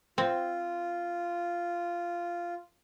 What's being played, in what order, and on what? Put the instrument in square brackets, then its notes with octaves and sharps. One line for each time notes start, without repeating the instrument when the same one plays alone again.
[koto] C4 [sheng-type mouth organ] F4